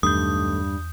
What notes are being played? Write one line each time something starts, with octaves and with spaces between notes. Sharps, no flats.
B1 E2 G2 D#3 A3 D#6 G6